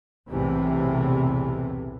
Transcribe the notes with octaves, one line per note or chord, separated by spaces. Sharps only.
B1 E2 A2 C3 E3